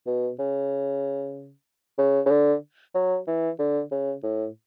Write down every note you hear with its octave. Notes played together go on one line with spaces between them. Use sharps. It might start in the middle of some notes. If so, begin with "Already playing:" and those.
B2
C#3
C#3
C#3
D3
F#3
E3
D3
C#3
A2